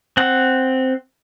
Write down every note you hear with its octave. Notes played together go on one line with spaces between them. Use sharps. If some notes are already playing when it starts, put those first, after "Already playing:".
C4 F#5